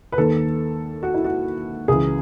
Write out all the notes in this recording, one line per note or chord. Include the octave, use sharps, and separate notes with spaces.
B4
D#2 D#3 A4
F#4
E4
F#4
C#2 C#3 E3 G#4